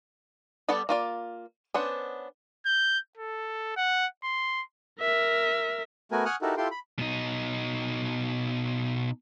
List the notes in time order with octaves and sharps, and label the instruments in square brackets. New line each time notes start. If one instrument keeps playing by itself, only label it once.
[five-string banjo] G3 B3 A4 D5 F#5
A#3 F4 D5
B3 C#4 D4 C5 F#5
[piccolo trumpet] G6
A4
F#5
C6
[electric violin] A#4 E5
[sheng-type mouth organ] A3 B3 F#4 A#4 G#5
F#5 G#5 C#6 D#6 F6 F#6
D#4 E4 F#4 G4 A4 A#4
E4 F4 G4 A4 G5 C6
B5
[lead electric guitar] B2 D#4